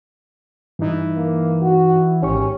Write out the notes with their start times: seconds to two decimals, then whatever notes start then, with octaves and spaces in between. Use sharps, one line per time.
0.79 G2 E3 D#4
1.17 A#3
1.62 F#4
2.22 G#1 D#3 C#4 G4 C#6